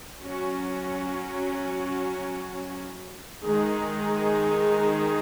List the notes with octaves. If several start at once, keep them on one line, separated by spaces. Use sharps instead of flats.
F#3 C#4 F#4
D#3 G#3 D#4 G#4